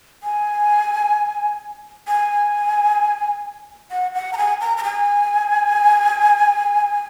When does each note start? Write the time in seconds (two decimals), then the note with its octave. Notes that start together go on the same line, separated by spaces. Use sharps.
0.23 G#5
2.08 G#5
3.91 F#5
4.15 F#5
4.33 A#5
4.38 G#5
4.61 A#5
4.77 A#5
4.84 G#5